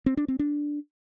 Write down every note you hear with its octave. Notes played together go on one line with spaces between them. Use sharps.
C4
D4
C4
D4